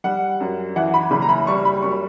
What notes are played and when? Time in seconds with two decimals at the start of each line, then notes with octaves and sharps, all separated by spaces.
0.04 G3 F#5
0.40 F#2
0.76 E3 F#5
0.94 B5
1.11 F#1 B5
1.22 A#5
1.29 B5
1.47 G3 C#6
1.65 B5
1.83 F#2 C#6